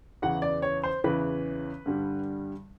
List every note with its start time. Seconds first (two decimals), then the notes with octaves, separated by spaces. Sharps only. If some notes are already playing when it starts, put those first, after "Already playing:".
0.22 E2 C#3 E3 F#5
0.42 D5
0.62 C#5
0.84 C5
1.04 E2 C#3 E3 B4
1.86 G2 D3 G3